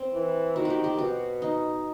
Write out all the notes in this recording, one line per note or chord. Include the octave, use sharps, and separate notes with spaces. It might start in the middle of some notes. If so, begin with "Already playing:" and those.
Already playing: C4
E3
D#3 F#4
F#4
G4
G4
B2 F#4
D#4